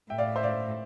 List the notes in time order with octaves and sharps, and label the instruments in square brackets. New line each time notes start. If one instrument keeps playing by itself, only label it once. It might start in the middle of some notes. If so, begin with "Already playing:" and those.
[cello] A2 [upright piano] E5 G5
[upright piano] D5 F5
C5 E5
D5 F5